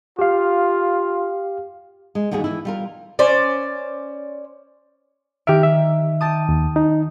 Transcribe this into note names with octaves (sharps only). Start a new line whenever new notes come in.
F4 G4 F5
G#3
D#2 D3 G3 F#4 G#4
E3 E4
G3 F4 A#4
C#4 C5 D5
D#3 G4 E5 F6 D7
E5
G4 A5 D#6
D#2
D#4